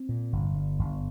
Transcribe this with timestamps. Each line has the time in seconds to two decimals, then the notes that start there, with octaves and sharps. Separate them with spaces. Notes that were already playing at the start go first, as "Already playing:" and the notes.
Already playing: C4
0.09 A#2
0.33 G1
0.55 G2
0.79 G1